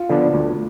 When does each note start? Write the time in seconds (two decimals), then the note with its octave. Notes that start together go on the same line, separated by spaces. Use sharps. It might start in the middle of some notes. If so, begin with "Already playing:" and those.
Already playing: F4
0.09 D3 F3 B3 D4
0.34 D2